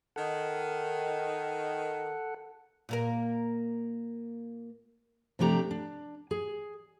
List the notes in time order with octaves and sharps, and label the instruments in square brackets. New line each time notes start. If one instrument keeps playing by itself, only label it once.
[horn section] D#3 [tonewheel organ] A4 F#5
[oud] A#2 A#3 A#4
[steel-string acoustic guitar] C3 F3 A3 D4 G4 A#5
D4
G#4